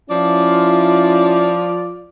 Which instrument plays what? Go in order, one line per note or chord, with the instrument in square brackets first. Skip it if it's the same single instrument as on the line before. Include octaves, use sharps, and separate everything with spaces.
[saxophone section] F3 D5 [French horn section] C#4 E4 [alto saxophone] F4